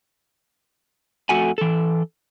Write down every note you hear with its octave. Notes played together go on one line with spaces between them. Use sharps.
F2 A3 F#4 A4 F#5 G#5
E3 A4